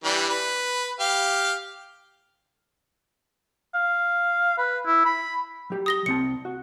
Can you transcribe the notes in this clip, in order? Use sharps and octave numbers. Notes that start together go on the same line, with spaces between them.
E3 G3 D4
B4
G4 F5
F5
B4
E4
B5
F#3 G4
D#6 A#6 G7
C2 C4 A5 C#7
F#4